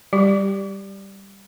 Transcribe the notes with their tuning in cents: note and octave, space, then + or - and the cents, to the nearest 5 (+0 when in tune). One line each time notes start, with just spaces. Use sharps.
G3 +0 G4 +0